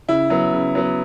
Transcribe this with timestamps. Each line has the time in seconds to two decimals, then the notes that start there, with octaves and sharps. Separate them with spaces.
0.08 C#3 E4
0.30 F#3 B3
0.53 C#3
0.75 F#3 B3